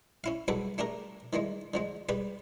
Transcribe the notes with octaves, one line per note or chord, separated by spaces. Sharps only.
C#4 E4 F5
C2 F#3 G#4 A4 B4 D6
A3 D4 G4 G#4 A#4
D#3 E3 G3 G#3
D3 F3 G#3
G3 G4 G#4 B4